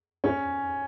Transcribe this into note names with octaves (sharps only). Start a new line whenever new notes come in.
C#4